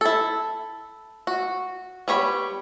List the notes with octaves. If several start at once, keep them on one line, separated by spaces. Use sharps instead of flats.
E4 A4
F#4
G3 B3 C#5 B5